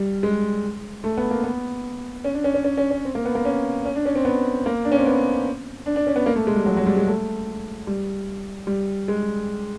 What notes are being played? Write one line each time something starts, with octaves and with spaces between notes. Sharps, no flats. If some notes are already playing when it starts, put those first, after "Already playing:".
Already playing: G3
G#3
A3
B3
A#3
B3
C#4
D4
C#4
C#4
C#4
C#4
C#4
C4
A#3
B3
A#3
C#4
C#4
D4
C#4
C4
B3
A#3
D4
C#4
C4
B3
D4
D4
C#4
B3
A#3
A3
G#3
G3
F#3
F#3
G3
G#3
A3
G3
G3
G#3